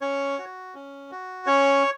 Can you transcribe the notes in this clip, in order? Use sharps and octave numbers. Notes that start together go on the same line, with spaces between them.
C#4 C#5
F#4
C#4
F#4
C#4 C#5